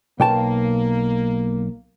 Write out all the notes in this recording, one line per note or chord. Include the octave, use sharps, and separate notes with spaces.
B1 A#3 G5 A5